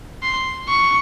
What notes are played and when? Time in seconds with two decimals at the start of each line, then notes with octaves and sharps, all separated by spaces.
0.23 C6
0.69 C#6